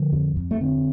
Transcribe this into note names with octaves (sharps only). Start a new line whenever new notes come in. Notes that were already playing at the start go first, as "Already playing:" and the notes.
Already playing: D3 F3
F2
F2
A3
D3 C4